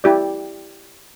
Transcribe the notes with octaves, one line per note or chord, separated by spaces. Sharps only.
E4 G4 D5